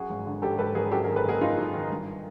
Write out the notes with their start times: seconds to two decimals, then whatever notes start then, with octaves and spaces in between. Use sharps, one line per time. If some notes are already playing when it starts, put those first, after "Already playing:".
Already playing: F#2 F#4 G#4
0.10 G#1
0.26 D3
0.42 G#1 G4 A4
0.58 G#1 A4 B4
0.75 G#1 G#4 A#4
0.91 F#2 G4 A4
1.04 G#4 A#4
1.09 D#3
1.16 A4 B4
1.24 F#1 G#4 A#4
1.41 F#1 D#4 F4
1.57 F#2
1.73 D#3
1.90 G2